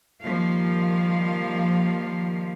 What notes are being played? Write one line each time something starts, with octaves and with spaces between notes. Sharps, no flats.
D#3 F3 G3 A#3 F5